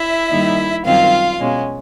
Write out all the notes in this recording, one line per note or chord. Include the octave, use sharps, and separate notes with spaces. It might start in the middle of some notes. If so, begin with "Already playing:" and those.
Already playing: E4 E5
G2 D#3 G3 A#3 D#4
F#2 D#3 G3 C4 F4 F5
B2 G#3 C#4